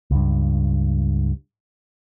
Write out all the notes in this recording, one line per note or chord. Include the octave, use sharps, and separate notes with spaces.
C#2 G2